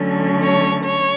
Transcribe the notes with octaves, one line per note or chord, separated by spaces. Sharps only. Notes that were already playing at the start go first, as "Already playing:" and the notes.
Already playing: D3 F#3 A3 C#4
C#5
C#5